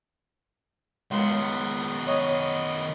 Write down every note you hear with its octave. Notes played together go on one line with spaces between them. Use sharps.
C#2 D#3 B3 C6
C#5 D#5